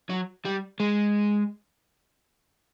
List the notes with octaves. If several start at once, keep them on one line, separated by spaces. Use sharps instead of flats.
F#3
G3
G#3